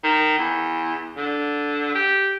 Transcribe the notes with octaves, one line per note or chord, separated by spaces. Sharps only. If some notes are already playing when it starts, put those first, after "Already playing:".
D#3
E2
D3
G4